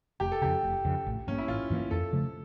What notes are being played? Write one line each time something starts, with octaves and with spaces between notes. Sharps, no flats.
F1 G4
A4
F2 C#3 G4
F1
F2 C#3
A1
G2 E3 A#3 C#4
E4
A1 F4
G2 E3 A#3
F2 A4
C#3 F3 A3